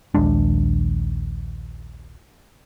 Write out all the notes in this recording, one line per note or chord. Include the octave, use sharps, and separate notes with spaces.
A#1 D#2 G#3 D4